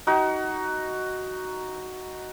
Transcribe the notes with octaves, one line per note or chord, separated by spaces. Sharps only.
D#4 F#4